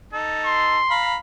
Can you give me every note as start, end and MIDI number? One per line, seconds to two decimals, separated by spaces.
0.13 0.78 63
0.13 0.78 69
0.45 0.95 84
0.90 1.16 77
0.90 1.16 82
0.90 1.16 83